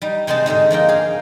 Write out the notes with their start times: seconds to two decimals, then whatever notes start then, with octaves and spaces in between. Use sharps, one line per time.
0.02 G3 D#4
0.27 C3 G#3 C4 D#4 C5 A5
0.46 G#2 D3 G#3 D#4
0.71 F3 A#3 D#4 G5
0.89 G#4 F5